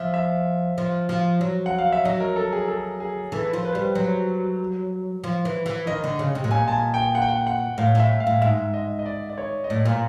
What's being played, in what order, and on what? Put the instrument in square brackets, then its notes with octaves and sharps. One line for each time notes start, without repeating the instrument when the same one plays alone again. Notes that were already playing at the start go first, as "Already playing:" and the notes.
Already playing: [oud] F3 [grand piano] E5
[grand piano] E5
[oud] F3
F3
F#3
[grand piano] F#5
F5
E5
[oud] F#3 [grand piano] D#5
[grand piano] A#4
A4
G#4
A4
G#4
[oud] E3 [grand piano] A4
[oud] F3
[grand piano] B4
[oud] G3 [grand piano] C5
[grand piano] B4
[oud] F#3 [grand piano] C5
[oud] F3
E3
E3
[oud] D#3 [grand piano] D#5
[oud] D3
C#3
C3
A2
[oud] A#2 [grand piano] G#5
[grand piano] A5
G#5
G5
F#5
G5
F#5
F#5
[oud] A2 [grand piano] F5
[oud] A2
[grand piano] E5
F5
[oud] A2
[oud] G#2 [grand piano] E5
[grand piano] D#5
D#5
D5
D5
C#5
D#5
[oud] A2 [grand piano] D5
[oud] A#2